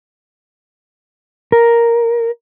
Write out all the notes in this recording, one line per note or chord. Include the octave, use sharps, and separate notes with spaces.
A#4